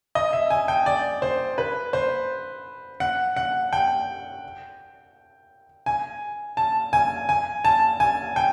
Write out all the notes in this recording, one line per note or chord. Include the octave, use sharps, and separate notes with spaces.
D#5
E5
G#5
G5
D5
C5
B4
C5
F#5
F#5
G5
G#5
A5
G#5
G#5
A5
G#5
G5